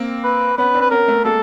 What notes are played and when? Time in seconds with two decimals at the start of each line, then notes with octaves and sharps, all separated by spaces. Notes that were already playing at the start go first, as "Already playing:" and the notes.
Already playing: A#3 C4
0.24 B4
0.57 B3 C#4 B4
0.74 C4 D4
0.81 B4
0.91 B3 C#4 A#4
1.08 A3 B3
1.24 G#3 A#3 A4